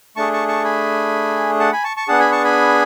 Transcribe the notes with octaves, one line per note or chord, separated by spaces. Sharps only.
A3 D4 G#4 A5 C#6
A5 C#6
A5 C#6
G#5 B5
F#5 A5
G#5 B5
A5 C#6
A5 C#6
B3 D4 G#4 F#5 A5
G#5 B5
A5 C#6
G#5 B5